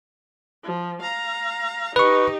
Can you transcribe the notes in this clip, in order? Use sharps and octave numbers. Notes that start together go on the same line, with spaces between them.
F3
F5 A#5
D#4 G4 B4 C#6